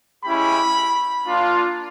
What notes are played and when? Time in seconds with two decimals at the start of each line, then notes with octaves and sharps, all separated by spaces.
0.24 G#3 C#4 E4 G4 B5
1.27 A#3 D4 F4